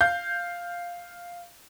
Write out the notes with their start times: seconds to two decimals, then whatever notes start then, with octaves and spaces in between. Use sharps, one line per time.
0.01 F5 G6